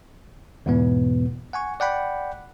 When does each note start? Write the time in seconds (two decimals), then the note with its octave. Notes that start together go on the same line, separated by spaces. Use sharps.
0.66 E2 G#2 B2 E3 B3
1.53 F#5 G#5 C#6
1.80 D5 F#5 G5 B5